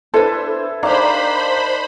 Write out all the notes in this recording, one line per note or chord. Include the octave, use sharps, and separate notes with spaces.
D4 E4 A4 B4 C5
D#3 D4 C5 D5 F5 A#5 B5